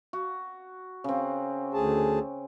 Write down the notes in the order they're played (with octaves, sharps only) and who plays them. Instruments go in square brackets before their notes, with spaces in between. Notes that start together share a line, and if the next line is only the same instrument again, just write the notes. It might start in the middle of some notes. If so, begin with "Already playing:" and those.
[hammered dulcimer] F#4
C#3 C4
[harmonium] D2 G#4 A5